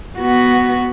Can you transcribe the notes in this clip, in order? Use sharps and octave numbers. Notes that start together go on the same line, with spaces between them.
B3 F#4